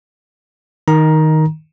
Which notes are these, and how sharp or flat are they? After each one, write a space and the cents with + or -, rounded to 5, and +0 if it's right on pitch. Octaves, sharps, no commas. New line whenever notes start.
D#3 +5 A#5 +15